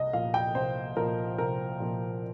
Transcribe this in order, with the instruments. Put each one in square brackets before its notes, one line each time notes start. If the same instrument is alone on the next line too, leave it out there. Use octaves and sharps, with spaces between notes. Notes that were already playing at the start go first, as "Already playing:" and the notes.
Already playing: [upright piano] C2 D#5
A#2 F3 F5
G5
C2 C5
A#2 F3 A#4
C2 A#4
A#2 F3